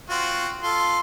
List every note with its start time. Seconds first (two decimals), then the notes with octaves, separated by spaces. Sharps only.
0.10 C4 F4 F#4
0.63 F4 A4 C6